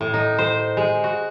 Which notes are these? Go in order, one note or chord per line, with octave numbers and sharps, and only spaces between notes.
A2
D#4
C5
G#3
F#4